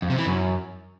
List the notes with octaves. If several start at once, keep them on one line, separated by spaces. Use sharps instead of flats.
F2
C3
E3
F#2